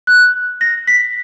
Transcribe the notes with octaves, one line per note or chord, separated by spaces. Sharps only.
F#6
A#6
B6